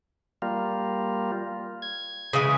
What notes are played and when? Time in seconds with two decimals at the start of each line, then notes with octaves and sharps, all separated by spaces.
0.42 G3 A#3 F4
1.82 G#6
2.33 C#3 E3 G#3